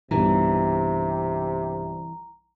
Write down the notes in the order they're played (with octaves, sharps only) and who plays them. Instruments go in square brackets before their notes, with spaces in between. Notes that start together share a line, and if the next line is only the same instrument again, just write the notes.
[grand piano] B1 G2 [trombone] C3 [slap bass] E3 [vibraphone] A#5